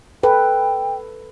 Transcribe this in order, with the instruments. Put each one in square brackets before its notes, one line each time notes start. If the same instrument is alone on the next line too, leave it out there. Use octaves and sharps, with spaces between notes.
[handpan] A4 B4 [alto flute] G5